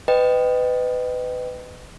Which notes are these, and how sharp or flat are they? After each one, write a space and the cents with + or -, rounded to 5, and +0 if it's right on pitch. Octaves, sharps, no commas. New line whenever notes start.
B4 +25 D#5 -15 G5 +0